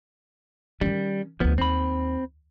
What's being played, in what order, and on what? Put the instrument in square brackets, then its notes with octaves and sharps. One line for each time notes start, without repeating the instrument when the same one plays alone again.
[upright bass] D#3 C#4 [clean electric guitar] G3
[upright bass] D2 D3 [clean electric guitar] F3 B3
[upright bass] D#2 [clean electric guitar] C4 B5